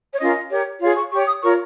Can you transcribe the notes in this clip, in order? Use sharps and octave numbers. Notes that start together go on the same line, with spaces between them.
C#5
C#4 F4 A#4 D#5
G4 A#4 C#5
F4 G#4 C#5
C#6
G4 C#5 C#6
D#6
F4 A#4 C#5 C#6